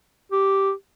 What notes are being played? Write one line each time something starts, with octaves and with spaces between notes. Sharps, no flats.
G4